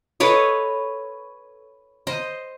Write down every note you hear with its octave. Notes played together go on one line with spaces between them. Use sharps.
A4 B4 C#5 D#5
C5 D#5